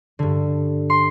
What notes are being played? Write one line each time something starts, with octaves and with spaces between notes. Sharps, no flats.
G2 D3
C6